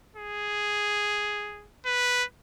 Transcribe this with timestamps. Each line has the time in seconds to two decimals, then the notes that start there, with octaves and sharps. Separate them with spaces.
0.16 G#4
1.86 B4